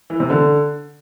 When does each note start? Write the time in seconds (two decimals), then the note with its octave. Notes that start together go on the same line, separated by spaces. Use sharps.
0.10 E3
0.20 C3
0.30 D3